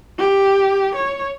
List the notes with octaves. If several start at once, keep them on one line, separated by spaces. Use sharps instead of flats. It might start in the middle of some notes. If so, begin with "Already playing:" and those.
G4
C#5